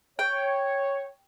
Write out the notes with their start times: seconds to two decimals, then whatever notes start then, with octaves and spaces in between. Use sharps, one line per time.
0.19 C#5 G5